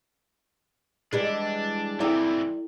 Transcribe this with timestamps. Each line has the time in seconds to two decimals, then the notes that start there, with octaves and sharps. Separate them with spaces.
1.13 E3 G3 G#3 D4
2.00 E3 C4 E4 A4 C5 D5 E5 G5